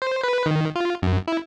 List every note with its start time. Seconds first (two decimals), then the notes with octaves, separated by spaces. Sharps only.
0.02 C5
0.23 B4
0.46 D#3
0.76 F4
1.02 F#2
1.28 E4